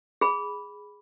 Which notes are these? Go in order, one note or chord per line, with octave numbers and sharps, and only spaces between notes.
G#4 B5